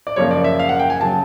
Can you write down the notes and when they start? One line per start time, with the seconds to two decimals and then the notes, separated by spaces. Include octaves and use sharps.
0.07 D5
0.16 F#2 C#3 F3 A#3 C#5
0.31 D5
0.44 E5
0.59 F5
0.69 F#5
0.79 G5
0.90 G#5
1.01 C#3 F#3 A5